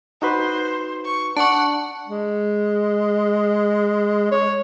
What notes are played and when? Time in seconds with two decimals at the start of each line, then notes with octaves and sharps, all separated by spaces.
0.22 D#4 F#4 B4 C5
1.05 C#6
1.37 D4 F#5 A5 C#6
2.07 G#3
4.31 C#5